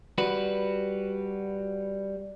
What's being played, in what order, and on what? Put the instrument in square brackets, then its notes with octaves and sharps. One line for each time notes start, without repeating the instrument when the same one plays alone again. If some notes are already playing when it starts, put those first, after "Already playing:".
[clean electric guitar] G3 F#4 B4